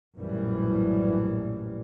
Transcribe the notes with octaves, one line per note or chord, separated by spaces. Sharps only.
A#1 F#2 A2 E3 G3